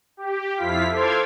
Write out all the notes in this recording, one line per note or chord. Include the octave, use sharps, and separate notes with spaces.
G4
F2 E4 F4 F5 B6
A4 C5 C6 D6 F6 G#6